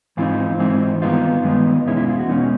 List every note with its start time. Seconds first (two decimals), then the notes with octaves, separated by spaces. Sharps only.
0.17 G#2 E3 G#3 C4 D#4 F4
0.59 G#2 E3 G#3 C4 D#4
1.02 G2 D#3 G#3 B3 D#4 F4
1.44 G2 D#3 G#3 B3 D#4
1.86 E2 B2 G#3 C#4 E4
1.97 E4
2.08 F4
2.19 F#4
2.29 E2 B2 G#3 C#4 D#4